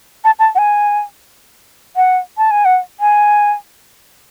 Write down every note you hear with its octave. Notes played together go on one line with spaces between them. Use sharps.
A5
A5
F#5
G#5
F#5
A5
G#5
F#5
G#5